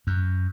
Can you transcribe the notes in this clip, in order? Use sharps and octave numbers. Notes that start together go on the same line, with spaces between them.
F#2